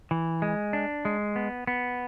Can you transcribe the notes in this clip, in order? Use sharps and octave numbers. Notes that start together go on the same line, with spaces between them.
E3
G#3
D4
G#3
B3
B3